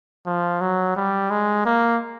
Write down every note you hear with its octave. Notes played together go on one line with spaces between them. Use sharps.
F3
F#3
G3
G#3
A#3